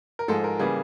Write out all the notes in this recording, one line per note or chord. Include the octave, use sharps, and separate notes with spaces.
A#4
G#2 F3 G#3 A4
A#4
C#3 E3 G3 A#3 G#4